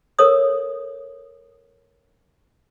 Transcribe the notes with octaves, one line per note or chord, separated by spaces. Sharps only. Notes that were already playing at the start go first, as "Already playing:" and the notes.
A4 A#4 C#5 D#6